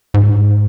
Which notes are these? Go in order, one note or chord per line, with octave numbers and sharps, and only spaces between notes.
G#2